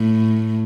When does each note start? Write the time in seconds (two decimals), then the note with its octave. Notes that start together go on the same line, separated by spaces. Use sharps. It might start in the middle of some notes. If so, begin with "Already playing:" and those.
Already playing: A2